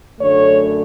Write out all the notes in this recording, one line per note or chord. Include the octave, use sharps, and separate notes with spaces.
F#2 D3 A3 C#5